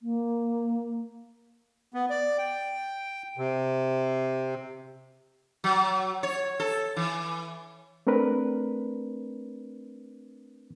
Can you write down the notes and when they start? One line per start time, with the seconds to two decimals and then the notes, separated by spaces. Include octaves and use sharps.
0.01 A#3
1.94 B3
2.10 D5
2.38 G5
3.37 C3
5.64 F#3
6.23 C#5
6.60 A4
6.96 E3
8.07 A3 C4 D4 A#4 B4